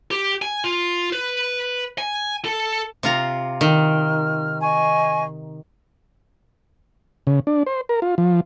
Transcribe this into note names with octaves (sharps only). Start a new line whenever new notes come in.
G4
G#5
F4
B4
G#5
A4
C3 F4 A#5
D#3 F6
D#5 G#5 C#6
C#3
D4
C5
A#4
F4
F3